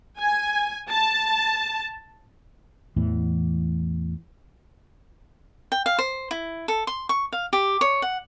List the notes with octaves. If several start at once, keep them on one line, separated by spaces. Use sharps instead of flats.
G#5
A5
E2 A2 E3
G5
F5
C5
E4
A4
C6
C#6
F5
G4
C#5
F#5